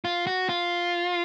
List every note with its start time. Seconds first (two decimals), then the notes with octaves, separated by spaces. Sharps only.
0.05 F4
0.27 F#4
0.49 F4